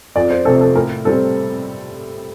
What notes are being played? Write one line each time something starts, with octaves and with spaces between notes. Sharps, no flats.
F2 D5
C5
C3 F3 A3 C4 A4
A4
A2 A#4
G3 C4 A4